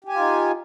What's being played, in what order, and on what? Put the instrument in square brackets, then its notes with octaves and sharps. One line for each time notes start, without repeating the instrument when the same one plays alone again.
[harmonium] G4
G#5
F4
D#4